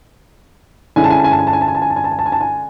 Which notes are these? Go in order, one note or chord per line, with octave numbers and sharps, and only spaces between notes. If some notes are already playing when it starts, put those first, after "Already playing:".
D3 G#3 C#4 E4 G#5
A5
G#5
A5
G#5
A5
G#5
A5
G#5
A5
G#5
A5
G#5
A5
G#5
A5
G#5
A5
G#5
A5
G#5